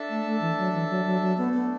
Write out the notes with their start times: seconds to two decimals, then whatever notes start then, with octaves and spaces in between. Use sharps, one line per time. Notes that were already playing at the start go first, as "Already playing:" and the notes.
Already playing: D4 A4 E5 A5
0.09 A3
0.26 A3
0.41 E3
0.58 F#3
0.74 E3
0.90 F#3
1.06 F#3
1.22 F#3
1.37 A3 B3 D4 A4
1.54 B3